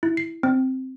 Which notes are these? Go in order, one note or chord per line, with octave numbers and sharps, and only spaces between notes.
E4
C7
C4